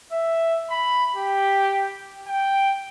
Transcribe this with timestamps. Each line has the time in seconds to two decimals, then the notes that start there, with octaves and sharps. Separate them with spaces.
0.12 E5
0.70 B5
1.16 G4
2.27 G5